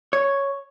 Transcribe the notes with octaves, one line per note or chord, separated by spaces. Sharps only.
C#5